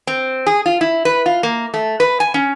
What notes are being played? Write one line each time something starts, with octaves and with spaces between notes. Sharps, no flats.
C4
G#4
F4
E4
B4
F4
A#3
A3
B4
G#5
C#4